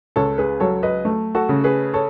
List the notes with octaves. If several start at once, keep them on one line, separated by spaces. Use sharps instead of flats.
C#2 A4 C#5
G#4 B4
F#3 A4 C#5
B4 D#5
A3
F#4 A4
C#3
G#4 B4
A4 C#5